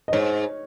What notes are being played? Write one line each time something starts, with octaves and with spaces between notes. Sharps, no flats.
D#5
G#2 C#5